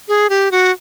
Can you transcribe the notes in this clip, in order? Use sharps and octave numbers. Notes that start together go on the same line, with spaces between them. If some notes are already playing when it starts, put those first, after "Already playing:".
G#4
G4
F#4